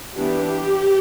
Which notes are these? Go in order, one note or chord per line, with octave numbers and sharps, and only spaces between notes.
E3 B3 D4 G4